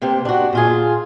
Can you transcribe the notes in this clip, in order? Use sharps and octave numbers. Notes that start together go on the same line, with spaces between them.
C3 A#3 G4 C5
D4 F#4
A#2 F4 G#4